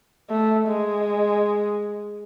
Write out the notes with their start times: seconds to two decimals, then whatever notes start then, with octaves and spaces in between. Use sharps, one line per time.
0.30 A3
0.68 G#3